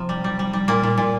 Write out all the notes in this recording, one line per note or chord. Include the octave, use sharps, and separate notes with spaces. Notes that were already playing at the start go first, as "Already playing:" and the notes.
Already playing: C3 F3
G3
G3
G3
G3
A#2 A#3
A#2
A#2